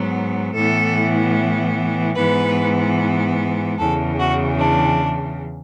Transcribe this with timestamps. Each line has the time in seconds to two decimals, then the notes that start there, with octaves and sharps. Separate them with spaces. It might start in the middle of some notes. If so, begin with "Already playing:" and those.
Already playing: G#2 F#3 B3
0.54 A2 E3 B3 A4
2.16 G#2 E3 B3 B4
3.79 E2 C#3 E3 A4
4.19 F#4
4.60 D4